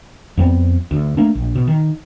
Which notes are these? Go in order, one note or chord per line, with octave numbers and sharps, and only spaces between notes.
F2 G3 B3 C4
D2
A3 A#3 D4
A#1
B2
D#3